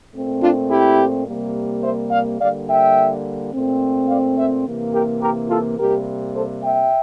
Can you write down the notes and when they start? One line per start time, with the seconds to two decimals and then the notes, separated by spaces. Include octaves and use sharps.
0.14 A#2 A3 C4
0.41 D4 F4
0.69 E4 G4
1.26 C3 G3 A#3
1.83 C5 E5
2.11 D5 F5
2.39 D3 G3 A#3 D5 F5
2.68 E5 G5
3.53 A#2 A3 C4
4.08 D5 F5
4.37 C5 E5
4.65 C3 E3 A#3
4.93 G4 A#4
5.22 G4 A#4
5.49 F4 A4
5.78 C3 G3 A#3 G4 A#4
6.34 A4 C5
6.62 E5 G5